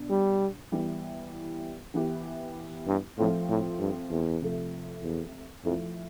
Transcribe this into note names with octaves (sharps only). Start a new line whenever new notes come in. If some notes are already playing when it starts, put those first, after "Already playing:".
Already playing: B2 D4
G3
E3 G3 B3 E4 G4
E3 B3 E4 G4
G2
A2 F3 A3 C4 F4
A2
G2
E2
C3 F3 A3
E2
F2 F3 A3 E4